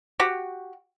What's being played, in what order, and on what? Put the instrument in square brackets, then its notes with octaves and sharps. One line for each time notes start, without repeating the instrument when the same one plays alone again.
[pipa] F#4 G4